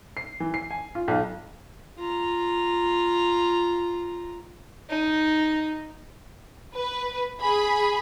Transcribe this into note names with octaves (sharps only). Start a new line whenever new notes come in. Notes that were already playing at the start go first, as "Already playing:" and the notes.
C7
E3
C7
G#5
F4
B1
F4 A#5
D#4
B4
G#4 B5